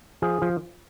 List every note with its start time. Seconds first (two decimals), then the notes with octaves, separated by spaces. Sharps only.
0.22 F3 G#4
0.42 F3